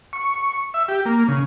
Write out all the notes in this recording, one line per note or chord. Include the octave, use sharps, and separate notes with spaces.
C#6
E5
G4
A#3
C#3